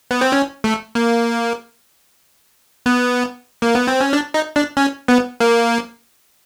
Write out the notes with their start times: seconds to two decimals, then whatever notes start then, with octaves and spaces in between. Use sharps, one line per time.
0.11 B3
0.21 C4
0.32 C#4
0.64 A3
0.95 A#3
2.86 B3
3.62 A#3
3.75 B3
3.87 C4
4.01 C#4
4.13 D4
4.34 D#4
4.56 D4
4.77 C#4
5.08 B3
5.40 A#3